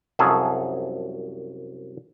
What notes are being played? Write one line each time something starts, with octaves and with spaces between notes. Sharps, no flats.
C2 F#2 F3 G#4 A4 A5